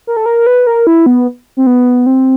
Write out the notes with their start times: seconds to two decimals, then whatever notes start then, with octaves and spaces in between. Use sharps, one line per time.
0.07 A#4
0.17 A4
0.26 A#4
0.47 B4
0.67 A#4
0.87 E4
1.06 B3
1.57 C4
1.67 B3
2.06 C4